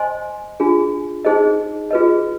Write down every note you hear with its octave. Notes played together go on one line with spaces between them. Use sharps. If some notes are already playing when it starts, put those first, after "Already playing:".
Already playing: C5 D#5 G#5 C6
D4 F4 G#4
D#4 G#4 C5 D#5
F4 G#4 B4 D#5